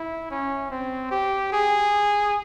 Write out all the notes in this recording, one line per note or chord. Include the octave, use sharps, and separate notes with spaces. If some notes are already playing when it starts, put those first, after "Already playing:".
Already playing: E4
C#4
C4
G4
G#4